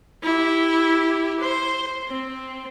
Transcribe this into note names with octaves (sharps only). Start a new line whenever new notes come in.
E4 G4
C5
C4